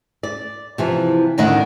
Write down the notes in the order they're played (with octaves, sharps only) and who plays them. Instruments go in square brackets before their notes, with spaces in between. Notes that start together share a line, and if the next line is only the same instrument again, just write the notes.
[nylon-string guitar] D5
C3 E3 F3
D2 A2 D#3 D4 D#5 F#5